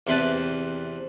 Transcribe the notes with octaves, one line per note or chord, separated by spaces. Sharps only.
E2 C3 C4 E4 B4 A5